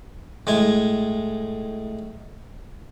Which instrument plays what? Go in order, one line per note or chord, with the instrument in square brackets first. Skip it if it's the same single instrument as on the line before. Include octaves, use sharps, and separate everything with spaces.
[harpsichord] A2 G#3 G#5